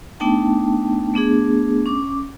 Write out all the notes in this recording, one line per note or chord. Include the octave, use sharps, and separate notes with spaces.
A3 B3 D4 D#4 G5 A5
A3 B3 D4 G#4
C#4 D6